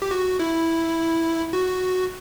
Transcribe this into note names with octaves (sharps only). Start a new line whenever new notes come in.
G4
F#4
E4
F#4